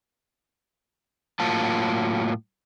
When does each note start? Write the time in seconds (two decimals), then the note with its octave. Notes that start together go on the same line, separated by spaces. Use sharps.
1.40 A2 F#3 A#3 F4 A5